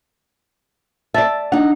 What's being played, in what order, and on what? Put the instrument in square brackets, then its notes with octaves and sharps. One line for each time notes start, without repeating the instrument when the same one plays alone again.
[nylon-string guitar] D5 E5 [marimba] A5 A6
[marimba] D4 [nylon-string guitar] D#4 F#5